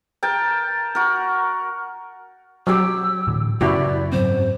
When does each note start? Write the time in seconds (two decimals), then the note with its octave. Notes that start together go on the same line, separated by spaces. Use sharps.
0.23 A#4 G5 A5
0.95 F#4 A#4
2.67 F#3 G4 E6
3.27 A2 D3 E3
3.61 F#2 C#3 E4 F#4 G4 D5
4.12 G#2 F#3 C4 C5